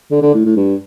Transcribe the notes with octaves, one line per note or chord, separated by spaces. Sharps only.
D3
D3
A2
A2
G2